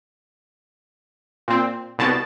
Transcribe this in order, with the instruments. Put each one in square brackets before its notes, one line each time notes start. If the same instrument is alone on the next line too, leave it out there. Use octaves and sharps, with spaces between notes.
[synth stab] A#2 C4
C2 B2 A5